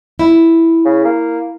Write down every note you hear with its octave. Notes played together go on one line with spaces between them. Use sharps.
E4
C#3
A#3